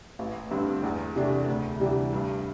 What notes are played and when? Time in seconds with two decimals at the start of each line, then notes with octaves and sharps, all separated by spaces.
0.19 A1
0.51 G2 D3 C4
0.83 E2
1.16 C3 E3 A3 D4
1.48 D2
1.80 C3 E3 G3 D4
2.13 G2